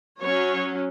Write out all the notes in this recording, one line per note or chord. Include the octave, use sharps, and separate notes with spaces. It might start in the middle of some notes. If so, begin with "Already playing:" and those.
F#3 C#4 C#5